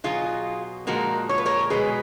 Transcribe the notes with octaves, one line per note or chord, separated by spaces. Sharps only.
B2 F#3 F4 G#4
A#2 F3 G#3 F#4 A#4
C#5
B4
A#4 C#5
B2 G#3 G#4 B4